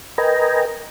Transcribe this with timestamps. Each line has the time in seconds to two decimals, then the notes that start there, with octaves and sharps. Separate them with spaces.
0.18 A#4 B4 D#5 G5 G#5 A#5